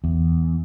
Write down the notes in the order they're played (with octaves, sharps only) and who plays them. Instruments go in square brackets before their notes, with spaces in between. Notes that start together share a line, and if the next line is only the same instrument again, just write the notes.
[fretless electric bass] E2